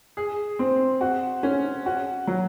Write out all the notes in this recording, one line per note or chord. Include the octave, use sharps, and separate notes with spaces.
G#4
C4
F#4
C#4
F#4
F#3